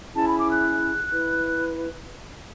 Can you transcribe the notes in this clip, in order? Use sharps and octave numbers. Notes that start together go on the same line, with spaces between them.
C#4 E4 G#4 A5
B5
D6
F#6
E4 B4